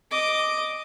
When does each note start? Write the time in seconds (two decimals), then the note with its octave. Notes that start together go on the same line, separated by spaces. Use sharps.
0.11 D#5 D6